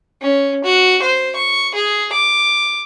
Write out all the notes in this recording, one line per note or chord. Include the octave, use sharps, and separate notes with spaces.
C#4
F#4
C5
C#6
G#4
D6